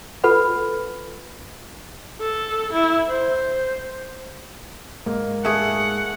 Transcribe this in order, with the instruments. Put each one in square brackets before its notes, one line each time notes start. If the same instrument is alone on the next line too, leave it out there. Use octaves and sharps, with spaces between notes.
[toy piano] F4 A4 B4 F#5 B5
[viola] A4
E4
[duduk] C5
[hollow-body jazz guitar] G#2 [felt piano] A#3
[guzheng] A3 G#4 [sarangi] F#5